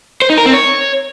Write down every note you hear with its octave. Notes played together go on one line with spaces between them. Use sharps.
C5
D#4
A#4
C4
C#5